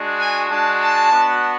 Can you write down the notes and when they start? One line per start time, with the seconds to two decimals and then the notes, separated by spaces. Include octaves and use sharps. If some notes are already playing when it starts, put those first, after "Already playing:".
Already playing: G#3 D4 F#4
0.19 G#5
0.50 G#3 D4 F#4 A5
0.80 A5
1.12 B3 D4 F#4